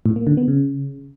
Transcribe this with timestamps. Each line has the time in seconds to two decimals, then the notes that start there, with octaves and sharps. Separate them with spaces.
0.06 A2
0.16 A#3
0.27 D3
0.37 B3
0.48 C#3